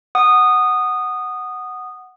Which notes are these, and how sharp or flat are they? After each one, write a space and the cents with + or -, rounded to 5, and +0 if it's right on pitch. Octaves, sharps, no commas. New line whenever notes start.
F#5 +0 D#6 -15